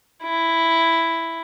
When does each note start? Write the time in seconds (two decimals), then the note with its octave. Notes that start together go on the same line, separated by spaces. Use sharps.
0.24 E4